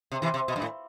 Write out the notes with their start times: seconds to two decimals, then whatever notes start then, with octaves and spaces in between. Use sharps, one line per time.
0.12 C3
0.22 C3 E3
0.34 C3
0.48 B2
0.56 G2
0.62 A2